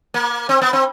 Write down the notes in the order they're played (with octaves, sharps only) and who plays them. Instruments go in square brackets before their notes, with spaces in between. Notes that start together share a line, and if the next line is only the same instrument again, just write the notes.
[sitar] A#3
C4
B3
C4